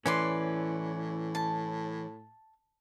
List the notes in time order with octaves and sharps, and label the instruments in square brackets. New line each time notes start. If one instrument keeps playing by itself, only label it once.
[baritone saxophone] A2 [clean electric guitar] E3 C#4 [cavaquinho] B4 D5 C6
[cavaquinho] A5